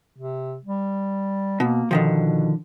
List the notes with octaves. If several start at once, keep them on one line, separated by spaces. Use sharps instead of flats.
C3
G3
B2 A#3
B2 D3 D#3 F3